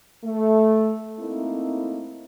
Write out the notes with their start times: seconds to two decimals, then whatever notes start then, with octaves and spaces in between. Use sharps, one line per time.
0.24 A3
1.19 A3 A#3 C4 D#4 E4